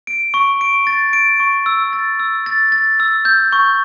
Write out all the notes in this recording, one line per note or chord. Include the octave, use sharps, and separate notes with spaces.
D7
C#6
D7
A6
D7
C#6
E6
A6
E6
A6
A6
E6
G6
C#6